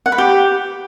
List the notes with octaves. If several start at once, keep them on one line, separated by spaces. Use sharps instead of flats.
F#5
B4
G4